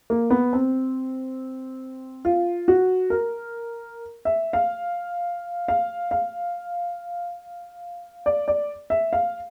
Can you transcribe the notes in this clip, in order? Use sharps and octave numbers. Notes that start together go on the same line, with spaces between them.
A#3
B3
C4
F4
F#4
A#4
E5
F5
F5
F5
D5
D5
E5
F5